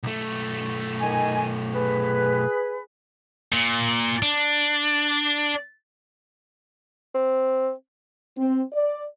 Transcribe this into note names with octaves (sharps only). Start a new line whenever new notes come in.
B1 A3
D#3 D#5 G#5
G#4 B4
A#2
D4
C4
C4
D5